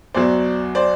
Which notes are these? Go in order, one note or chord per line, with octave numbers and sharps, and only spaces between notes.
E2 B2 F#3 C5 D5
C5 D5